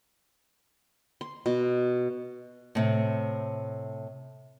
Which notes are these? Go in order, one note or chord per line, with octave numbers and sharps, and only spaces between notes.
C6
B2
A2 C3